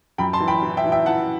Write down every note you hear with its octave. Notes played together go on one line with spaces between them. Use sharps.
F#2 G5 B5
A5 C6
E3
G5 B5
E3
E5 G5
E3
E5 G5
E3 F#5 A5